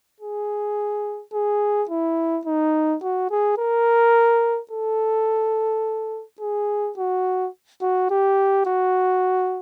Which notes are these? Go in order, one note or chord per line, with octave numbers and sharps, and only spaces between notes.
G#4
G#4
E4
D#4
F#4
G#4
A#4
A4
G#4
F#4
F#4
G4
F#4